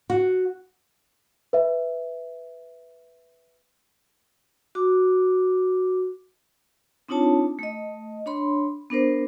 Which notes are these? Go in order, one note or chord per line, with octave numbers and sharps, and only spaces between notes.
F#4
B4 E5
F#4 D6
C4 D4 D#4 F4 C#5 A5
A3 D#5
D4 C#5 B5 C6
B3 D4 A#4 C5